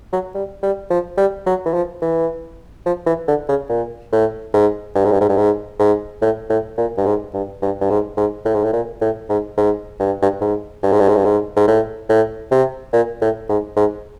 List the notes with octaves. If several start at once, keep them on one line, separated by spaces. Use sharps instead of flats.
F#3
G3
G3
F3
G3
F#3
E3
F3
E3
F3
E3
D3
C#3
A#2
A2
G#2
G2
G#2
G2
G#2
G2
G#2
G#2
A2
A2
A#2
G2
G#2
G2
G2
G2
G#2
G#2
A2
G#2
A2
A#2
A2
G#2
G#2
G2
G2
G#2
G2
G#2
G2
G#2
G2
G#2
G#2
A2
A2
C3
A#2
A2
G#2
G#2